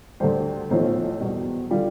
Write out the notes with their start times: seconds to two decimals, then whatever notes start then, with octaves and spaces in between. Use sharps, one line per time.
0.20 D2 D3 G3 C5
0.70 B1 A2 F3 C5
1.21 E2 B2 G3
1.71 D3 G3 F4